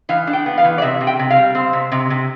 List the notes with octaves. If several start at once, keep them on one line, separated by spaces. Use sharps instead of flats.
E3 F5
D4
G5
B3
F5
E3
D5
C3 E5
C3
G5
C3
F5
G3
C4
C3
C3
C3